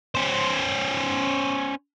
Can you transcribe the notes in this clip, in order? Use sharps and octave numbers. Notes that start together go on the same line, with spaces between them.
C#4 C5